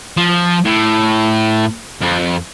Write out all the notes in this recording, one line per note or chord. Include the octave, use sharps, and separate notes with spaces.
F3
A2
F2